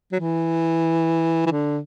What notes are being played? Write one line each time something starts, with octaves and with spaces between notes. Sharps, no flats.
F#3
E3
E3
D3